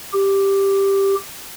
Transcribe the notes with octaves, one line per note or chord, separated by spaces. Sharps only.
G4